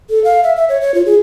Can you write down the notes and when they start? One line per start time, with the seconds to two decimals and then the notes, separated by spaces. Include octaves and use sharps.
0.10 A4
0.24 F5
0.43 E5
0.57 E5
0.69 C#5
0.81 C#5
0.94 F4
1.06 G#4